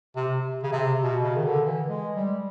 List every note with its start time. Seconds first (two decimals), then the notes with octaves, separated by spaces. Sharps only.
0.16 C3
0.63 C#3
0.72 C3
1.02 B2
1.23 C#3
1.36 D#3
1.45 D3
1.66 E3
1.88 G#3
2.16 G3